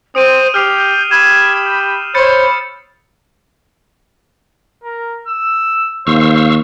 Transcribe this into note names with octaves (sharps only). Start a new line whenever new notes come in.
C4 C5 D#6 D7 D#7
G4 F6 G6 C7 F7
G4 B5 E6 G#6 E7
G6
C5 C#5 B5 G6 A6 C#7
A#4
E6
D#2 C5 F5 C#6 E6